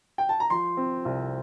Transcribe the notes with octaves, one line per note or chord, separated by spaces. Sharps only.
G5
A5
A#5
F3 C6
C4
C2